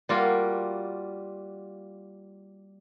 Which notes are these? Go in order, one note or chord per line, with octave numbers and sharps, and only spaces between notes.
G3 A#3 F4 F#4